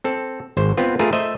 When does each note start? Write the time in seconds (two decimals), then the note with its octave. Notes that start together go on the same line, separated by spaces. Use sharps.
0.04 C4 A4
0.57 G#1 C5
0.77 B3 C4 F4 B4
0.99 A3 F4 G#4 A#4 B4
1.13 A3 C5 D#5 E5